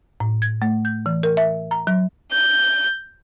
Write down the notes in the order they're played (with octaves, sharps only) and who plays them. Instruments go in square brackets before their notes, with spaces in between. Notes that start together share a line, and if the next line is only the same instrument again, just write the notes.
[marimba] A2
G#6
A3
G6
E3
A#4
E5
A#5
F#3
[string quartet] G6